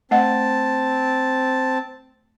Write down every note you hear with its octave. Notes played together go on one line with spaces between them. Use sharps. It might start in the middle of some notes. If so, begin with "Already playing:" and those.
A3 C4 D#5 F#5 A5